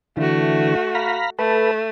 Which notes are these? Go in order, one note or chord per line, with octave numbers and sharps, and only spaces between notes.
D3 E3 A3 F#4
F5 A#5 B5
A3 A4 B4